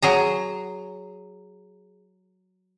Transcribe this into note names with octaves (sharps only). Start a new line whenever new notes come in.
F#3 G#4 A#5